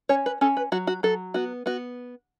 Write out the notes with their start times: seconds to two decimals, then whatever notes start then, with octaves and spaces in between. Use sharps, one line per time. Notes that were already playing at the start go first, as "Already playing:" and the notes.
0.09 C#4 C#5
0.26 B4
0.41 C#4 A4
0.57 B4
0.72 F#3 F#4
0.87 F#4
1.03 F#3 A4
1.34 B3 F#4
1.66 B3 F#4